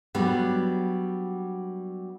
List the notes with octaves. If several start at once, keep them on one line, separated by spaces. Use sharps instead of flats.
F#3 G3 B3 D4